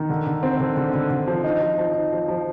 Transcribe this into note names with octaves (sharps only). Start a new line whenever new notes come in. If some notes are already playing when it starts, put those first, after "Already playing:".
Already playing: D#3
D3
D3
C4
D3
D3
D3
D3
F3
D#4
F3
F3
D#4
F3
F3